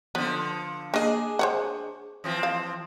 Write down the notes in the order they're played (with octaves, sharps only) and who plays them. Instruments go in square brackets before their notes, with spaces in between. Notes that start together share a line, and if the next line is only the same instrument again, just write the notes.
[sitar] D3 F3 [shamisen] B3
[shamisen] A#3 D#5 [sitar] D4 G#4
[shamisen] C5 C#5 F#5
[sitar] E3 F3 C4
[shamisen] F5